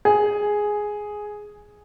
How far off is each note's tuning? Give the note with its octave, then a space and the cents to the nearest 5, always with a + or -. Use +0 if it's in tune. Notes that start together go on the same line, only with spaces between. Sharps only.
G#4 +0